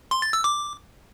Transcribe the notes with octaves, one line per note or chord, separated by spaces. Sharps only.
C6
A6
E6
D6